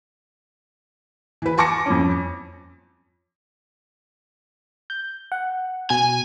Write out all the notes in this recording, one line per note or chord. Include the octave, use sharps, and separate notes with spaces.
E3 B4
G#5 A5 C#6 D6 A#6 C#7
F2 C#4
G6
F#5
B2 G#5